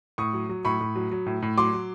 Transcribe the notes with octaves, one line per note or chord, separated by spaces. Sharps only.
A2 C#6 D#6
F#3
F#3
A2 B5 C#6
A2
F#3
F#3
A2
A2
F#3 C6 D6
F#3